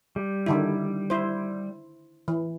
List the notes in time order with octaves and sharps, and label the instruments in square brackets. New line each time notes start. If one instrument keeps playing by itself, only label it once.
[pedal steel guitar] G3
[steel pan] D3 D#3 E4
E4 C5
E3